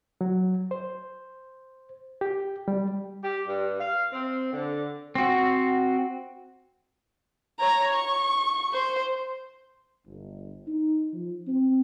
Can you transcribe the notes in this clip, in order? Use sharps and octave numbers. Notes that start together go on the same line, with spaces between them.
F#3
C5
G4
G3
G4
G2
F5
C4
D3
C4 F#4
C#5 A#5
C#6
C5
G1
D#4
F3
C4